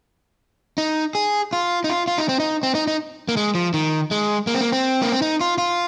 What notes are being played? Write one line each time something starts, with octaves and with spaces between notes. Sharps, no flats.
D#4
G#4
F4
D#4
F4
F4
D#4
C4
D#4
C4
D#4
D#4
A#3
G#3
F3
D#3
G#3
A#3
C4
A#3
C4
A#3
C4
D#4
F4
F4